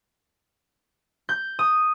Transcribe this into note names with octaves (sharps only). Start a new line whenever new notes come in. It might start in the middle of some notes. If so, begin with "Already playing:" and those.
G6
D#6